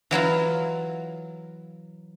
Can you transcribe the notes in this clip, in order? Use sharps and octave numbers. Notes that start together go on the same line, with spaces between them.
E3 F#3 E4 F4